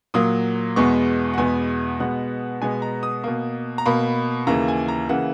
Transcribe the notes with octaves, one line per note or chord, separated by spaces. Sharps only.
A#2 F#3 A#3 D#6
E2 B2 G#3 B3 C#6
F#5
E2 B2 G#3 B3 G#5
B2 G#3 B3 F#5
B2 G#3 B3 G#5
A#5
D#6
B2 A#3
A#5
B2 A#3 B5
D#2 C#3 E3 A#3 A#5
G#5
A#5
C#3 E3 A#3 F#5